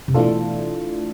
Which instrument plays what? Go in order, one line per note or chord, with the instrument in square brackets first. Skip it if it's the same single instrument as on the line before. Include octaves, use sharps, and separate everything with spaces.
[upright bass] C3
[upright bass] B2 [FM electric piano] E3 A3 D4 F4 A4